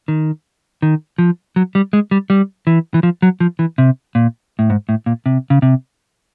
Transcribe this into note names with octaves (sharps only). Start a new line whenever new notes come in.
D#3
D#3
F3
F#3
G3
G#3
G3
G3
E3
E3
F3
F#3
F3
E3
C3
A#2
A2
G#2
A2
A#2
C3
C#3
C3